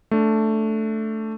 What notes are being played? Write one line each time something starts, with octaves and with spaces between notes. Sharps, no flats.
A3 D4